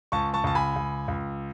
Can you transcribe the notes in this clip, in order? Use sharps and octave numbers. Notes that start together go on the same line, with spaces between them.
C#2 A5 C#6
A5 C#6
C#2 A5
G#5 B5
C#2
C#2